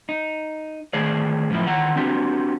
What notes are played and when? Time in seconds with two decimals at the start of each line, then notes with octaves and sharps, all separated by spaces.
0.09 D#4
0.93 D#3 A3 G#4 C5 D5
1.50 F#2 A2 D#3 F3 E4
1.66 D#3 E3 F#5 A#5
1.96 C4 D4 F#4 G4